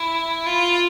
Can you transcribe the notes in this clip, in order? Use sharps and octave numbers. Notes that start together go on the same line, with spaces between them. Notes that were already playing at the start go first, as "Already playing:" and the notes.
Already playing: E4
F4